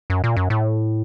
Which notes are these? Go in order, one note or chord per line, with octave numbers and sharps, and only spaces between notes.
F#2
A#2
F#2
A2